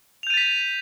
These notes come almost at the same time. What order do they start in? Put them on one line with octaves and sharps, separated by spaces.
F7 G6 D#7 A6 B6